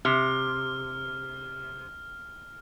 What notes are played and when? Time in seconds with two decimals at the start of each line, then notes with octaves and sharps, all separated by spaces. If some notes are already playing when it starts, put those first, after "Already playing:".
0.05 C3 F6